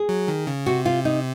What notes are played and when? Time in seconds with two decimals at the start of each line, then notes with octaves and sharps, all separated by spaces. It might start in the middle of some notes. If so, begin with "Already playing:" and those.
Already playing: G#4
0.09 F#3
0.28 D#3
0.47 C#3
0.66 C3 F#4
0.86 F4
1.05 D#4